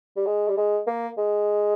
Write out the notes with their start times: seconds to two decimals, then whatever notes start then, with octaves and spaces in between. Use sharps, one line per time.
0.16 G3
0.26 G#3
0.48 G3
0.57 G#3
0.87 A#3
1.18 G#3